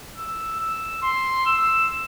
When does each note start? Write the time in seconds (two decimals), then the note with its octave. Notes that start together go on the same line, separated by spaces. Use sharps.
0.17 E6
0.60 E6
1.02 C6
1.46 E6